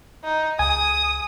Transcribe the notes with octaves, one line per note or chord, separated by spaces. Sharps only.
D#4
C#2 G#5 D#6